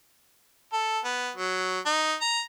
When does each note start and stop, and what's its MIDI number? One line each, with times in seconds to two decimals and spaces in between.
0.73 1.00 69
1.05 1.31 59
1.37 1.80 54
1.86 2.15 63
2.21 2.41 82